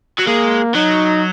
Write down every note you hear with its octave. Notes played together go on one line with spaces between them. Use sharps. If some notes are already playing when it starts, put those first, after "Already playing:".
F#3
G#3 A#3
F#3 D#4